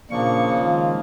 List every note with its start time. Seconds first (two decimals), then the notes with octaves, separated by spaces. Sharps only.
0.11 A#2 C#3 F3 A#3 D4 C#6
0.58 D#3 G#3 F4